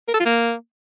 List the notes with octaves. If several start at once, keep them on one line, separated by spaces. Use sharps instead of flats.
A#4
A4
F4
A#3